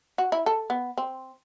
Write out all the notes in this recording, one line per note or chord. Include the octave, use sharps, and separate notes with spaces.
F#4
E4
A4
B3
C4